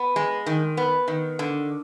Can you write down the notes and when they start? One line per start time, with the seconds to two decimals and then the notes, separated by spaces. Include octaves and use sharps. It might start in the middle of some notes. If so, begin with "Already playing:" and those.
Already playing: B3
0.16 G#3
0.46 D#3
0.77 B3
1.08 D#3
1.39 D3